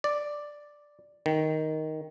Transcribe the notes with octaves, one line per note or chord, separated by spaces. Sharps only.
D5
D#3